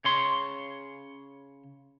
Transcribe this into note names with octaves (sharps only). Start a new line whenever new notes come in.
C#3 C#5 C6